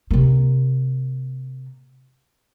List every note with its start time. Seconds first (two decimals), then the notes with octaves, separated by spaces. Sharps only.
0.11 C3 A#3